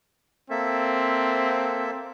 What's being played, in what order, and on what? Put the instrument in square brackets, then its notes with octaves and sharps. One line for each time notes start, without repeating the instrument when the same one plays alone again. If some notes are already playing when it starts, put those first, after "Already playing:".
[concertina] A#3 A4 E5 [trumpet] C4